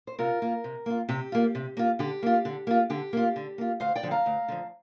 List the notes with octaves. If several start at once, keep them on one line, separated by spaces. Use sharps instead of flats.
C5
C3 F4 A#4
A#3 F4
C3
A#3 F4
C3 G4
A#3 F4
C3
A#3 F4
D3 G4
A#3 F4
D3
A#3 F4
D3 G4
A#3 F4
D3
A#3 F4
D2 C5 F5
D5 G5
D3 F3
F5 A#5
D2
D3 F3